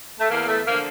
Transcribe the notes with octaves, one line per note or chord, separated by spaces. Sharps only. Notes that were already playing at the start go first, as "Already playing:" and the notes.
A3
E2 A#3
A3
D3 F3 A#3